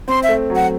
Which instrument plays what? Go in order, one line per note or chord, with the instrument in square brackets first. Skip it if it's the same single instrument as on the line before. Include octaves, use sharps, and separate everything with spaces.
[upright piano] C4 [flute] C6
[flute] E5
[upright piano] A3
F#3
[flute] F#5